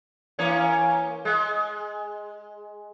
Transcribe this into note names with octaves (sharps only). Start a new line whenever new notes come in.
E3 A#3 C#4
G#3